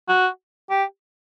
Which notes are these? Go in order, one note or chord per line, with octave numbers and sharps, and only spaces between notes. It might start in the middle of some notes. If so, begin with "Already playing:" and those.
F#4
G4